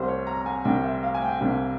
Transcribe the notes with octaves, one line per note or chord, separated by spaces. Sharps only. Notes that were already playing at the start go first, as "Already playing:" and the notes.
Already playing: C2 C3 G3 C5
C#5
A#5
A#5
G#5
C2 C3 G3 G5
E5
F5
G#5
G5
C2 C3 G3